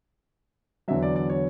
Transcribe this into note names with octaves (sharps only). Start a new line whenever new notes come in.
E2 D3 F#3 E5
D5
D5
C#5